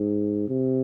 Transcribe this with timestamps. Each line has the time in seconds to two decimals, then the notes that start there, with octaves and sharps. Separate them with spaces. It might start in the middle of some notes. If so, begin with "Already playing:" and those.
Already playing: G#2
0.48 C3